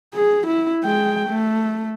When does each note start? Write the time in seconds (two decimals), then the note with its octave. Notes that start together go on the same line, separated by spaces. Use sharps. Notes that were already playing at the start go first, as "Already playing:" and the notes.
0.14 G#4
0.47 E4
0.84 G#3 G5
1.28 A3